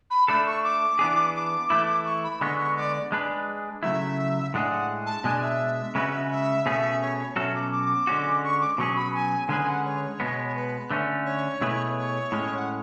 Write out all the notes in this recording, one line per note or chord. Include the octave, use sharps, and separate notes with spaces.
B5
A3 D4 A4 B5
C#6
D6
E3 B3 D4 G#4
D6
E3 A3 E4
C#6
B5
D3 G#3 B3 C#6
C#6
D5
G#3 D4 G#4 B4
C#3 F#3 A3 E4 E5
A2 G#3 D4 G#4 F#5
F#5
A5
B2 G#3 D4 G#5
E5
C#3 G#3 C#4 F#4 B4
E5
B2 A3 C#4 G#4 E5 F#5
C#5
C#5
B2 F#3 C#4 F#4 A4 E5
D6
D6
D3 G#3 C#4 F#4
C#6
D6
B2 F#3 C#4 G#4 C#6
B5
G#5
D3 G#3 C#4 G#4 B4 G#5
F#5
C#5
B2 G#3 B3
C#5
B4
D3 A3 C#4
C#5
B2 A3 E4 G#4 B4
C#5
A2 G#3 C#4
F#5